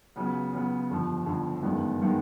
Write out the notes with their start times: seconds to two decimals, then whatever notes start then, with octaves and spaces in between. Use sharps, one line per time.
0.16 C#2 C#3 F#3 B3
0.53 C#2 C#3 F#3 B3
0.90 G1 F2 D3 F3
1.26 G1 F2 D3 F3
1.63 G1 F#2 D#3 G#3 B3
2.02 D#3 G#3 B3